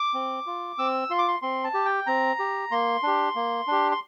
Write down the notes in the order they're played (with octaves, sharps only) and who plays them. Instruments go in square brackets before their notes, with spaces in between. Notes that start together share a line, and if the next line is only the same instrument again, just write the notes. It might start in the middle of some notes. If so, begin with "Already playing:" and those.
Already playing: [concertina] D6
C4
F4
C4 E6
F4 C6
D6
C6
C4 C6
A5
G4
G5
C4 A#5
G4
A#3 C6
D4 G4
A#3
D4 G4
C6